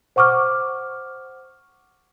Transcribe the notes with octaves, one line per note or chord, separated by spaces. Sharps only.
C5 F#5 C#6 D6 F6